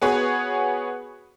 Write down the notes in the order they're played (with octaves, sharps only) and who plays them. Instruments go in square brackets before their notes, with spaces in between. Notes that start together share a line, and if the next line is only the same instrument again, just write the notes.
[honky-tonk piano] B3 F#4 G#4 B4 C#5